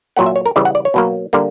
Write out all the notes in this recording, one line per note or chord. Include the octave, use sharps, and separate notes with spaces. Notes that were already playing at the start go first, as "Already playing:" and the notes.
A#2 F#3 A#3 F#5
E5
C#5
A#4
C#3 E3 G3 D5
F#5
D5
C#5
B2 F#3 A#3
D3 G3 A#3